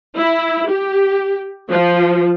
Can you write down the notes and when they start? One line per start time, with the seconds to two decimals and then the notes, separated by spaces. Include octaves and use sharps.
0.16 E4
0.68 G4
1.69 F3